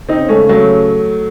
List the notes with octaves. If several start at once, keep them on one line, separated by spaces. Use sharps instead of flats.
C4 D#4
C#3
A3 C#4
F#3 A3